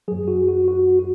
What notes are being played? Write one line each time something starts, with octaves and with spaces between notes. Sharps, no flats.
F#2 F#3 G#4
F#4
F#4
F#4
F#4